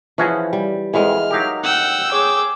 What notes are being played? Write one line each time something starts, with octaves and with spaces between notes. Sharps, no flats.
E3 F3 C#4 E4 F#4 G#4
G3
F2 E3 G#3 B3 F6
F#3 D#4 G4 A#4 F5
F#5 G5 E6
G#4 C#5 D6